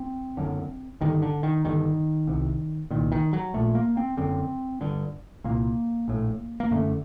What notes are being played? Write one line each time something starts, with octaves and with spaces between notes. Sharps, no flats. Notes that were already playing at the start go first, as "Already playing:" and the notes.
Already playing: C4
F#1 F#2 D3
G1 G2 D3 D#3
D3
D#3
G1 G2 D3 D#3
C2 C3
C2 A#2 D#3
D#3
F#3
A#1 A#2 A3
A#3
C4
F#1 F#2 D3 C4
G1 G2 D3
C2 A#2 A#3
A#1 A2
A#3
F#1 F#2 D3 A3